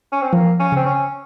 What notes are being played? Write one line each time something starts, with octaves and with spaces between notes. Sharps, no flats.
C#4
C4
F3 A#3
C#4
C#3 C4
C#4